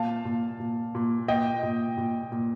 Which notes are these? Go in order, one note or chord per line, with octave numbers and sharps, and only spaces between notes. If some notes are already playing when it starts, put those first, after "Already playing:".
Already playing: A#2 F5 A5
A#2
A#2
A#2
A#2 D#5 G5
A#2
A#2
A#2